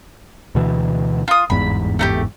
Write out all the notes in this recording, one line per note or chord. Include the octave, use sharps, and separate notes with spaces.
D2 B2 E3
F4 D#6
G1 E2 G#2 B5
A3 D#4 G4